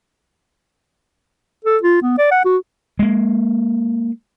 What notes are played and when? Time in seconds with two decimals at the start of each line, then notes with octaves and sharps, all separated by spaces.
1.65 A4
1.83 F4
2.02 B3
2.18 D5
2.31 F#5
2.45 F#4
2.99 G#3 A#3